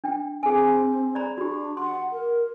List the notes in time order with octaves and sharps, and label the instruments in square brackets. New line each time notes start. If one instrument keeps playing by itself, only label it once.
[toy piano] D4 G5
[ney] C4 [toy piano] G#4 G#5
[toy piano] D5 A#5 B5
[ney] D4 [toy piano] F#4 G4
[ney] F#5 [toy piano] C6
[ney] A#4